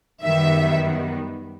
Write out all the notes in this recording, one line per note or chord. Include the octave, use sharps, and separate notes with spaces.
F#2 D#3 G3 B3 E5